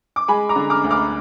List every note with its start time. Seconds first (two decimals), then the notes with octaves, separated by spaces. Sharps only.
0.16 D6
0.28 G#3 G#5 B5
0.49 A#5 D6
0.56 D3
0.70 D6 F6
0.84 D2
0.90 D6 F6